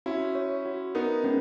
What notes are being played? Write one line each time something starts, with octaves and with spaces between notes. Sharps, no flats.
C#4 E4 F#4
C#5
F#4
B3 D#4 A#4
G#3 B3 C#4